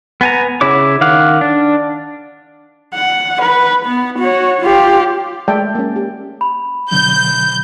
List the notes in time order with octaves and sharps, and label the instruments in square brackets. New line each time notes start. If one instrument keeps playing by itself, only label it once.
[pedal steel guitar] B3 G#5 A#5
C#3 E4 C#5 D6
D#3 F5 F#5 D6
D4
[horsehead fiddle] F#5
B4
B3
F#4 C#5
F4 G4
[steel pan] G#3 A3 D5 E5 G5 A5
A#3 C#4
G4
[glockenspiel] B5
[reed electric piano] B2 D3 F#3 [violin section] G6